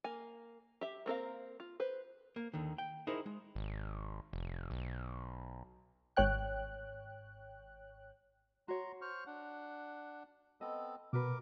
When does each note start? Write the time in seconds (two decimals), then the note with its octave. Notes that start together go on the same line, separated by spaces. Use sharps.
0.04 A#3 G#5
0.81 G4 E5
1.06 A#3 C4 A#4 F5
1.60 F4
1.80 B4 C5
2.36 A#3
2.54 D#2 D3 D#3
2.78 G5
3.07 D#4 E4 G#4 A#4 C5
3.26 G#3
3.55 G#1
4.33 F1
4.71 B1
6.17 G#1 C#5 G5 F#6
8.68 F#4 C#5 A#5 C6
9.01 C5 C#6 F6
9.26 D4 F#5
10.61 B3 C4 A4 D#5
11.13 B2 F#4 A#4 B4 D6